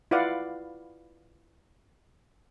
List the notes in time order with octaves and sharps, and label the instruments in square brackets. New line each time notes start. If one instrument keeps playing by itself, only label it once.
[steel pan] E4 F4 B4 D5 F5 F#5